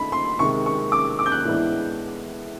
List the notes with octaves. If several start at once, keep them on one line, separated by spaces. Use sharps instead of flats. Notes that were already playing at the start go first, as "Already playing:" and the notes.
Already playing: D#3 A3 D#4 B5
C6
C3 D#3 G#3 C#6
C#6
D6
D6
G6
F#6
A2 E3 G#3 B3 D4